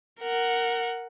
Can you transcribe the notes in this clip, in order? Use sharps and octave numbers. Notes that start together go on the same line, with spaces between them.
A#4 F#5